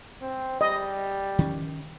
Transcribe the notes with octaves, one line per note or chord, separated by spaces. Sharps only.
C4
G3 D#5
D#3 C#4